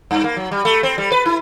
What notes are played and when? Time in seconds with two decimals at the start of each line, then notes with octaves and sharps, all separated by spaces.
0.11 G2
0.24 A#3
0.37 F#3
0.51 G3
0.65 A3
0.83 C4
0.98 G3
1.12 B4
1.26 E4